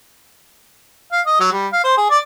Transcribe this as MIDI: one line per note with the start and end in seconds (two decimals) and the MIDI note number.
1.12 1.21 77
1.26 1.37 75
1.40 1.52 54
1.52 1.67 55
1.72 1.80 77
1.84 1.92 72
1.97 2.07 68
2.10 2.18 74